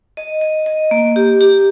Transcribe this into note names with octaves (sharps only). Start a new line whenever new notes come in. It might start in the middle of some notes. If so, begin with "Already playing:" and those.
D#5
D#5
D#5
A#3
G4
G4